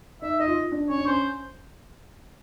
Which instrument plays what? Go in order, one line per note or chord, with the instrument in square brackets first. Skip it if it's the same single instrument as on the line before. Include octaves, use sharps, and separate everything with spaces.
[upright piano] D#4 [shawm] E5
[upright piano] D#4 [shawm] D#5
[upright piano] F4
D4
[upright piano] C#4 [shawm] C#5
[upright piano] D4
[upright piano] C#4 [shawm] C5